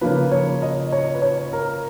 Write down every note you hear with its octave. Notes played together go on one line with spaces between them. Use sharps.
C#3 F3 A#3 F4 B4
C#5
D#5
C#5
B4
C#5
A#4